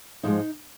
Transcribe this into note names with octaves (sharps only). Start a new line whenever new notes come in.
G#2 F3 G#3 D#4